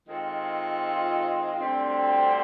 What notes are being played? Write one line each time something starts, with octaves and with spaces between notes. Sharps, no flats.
D#3 G#3 C4 F4 A4
D2 D3 G3 C4